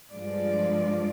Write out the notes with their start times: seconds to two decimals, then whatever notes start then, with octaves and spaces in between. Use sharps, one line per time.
0.12 G2 F3 G#3 D5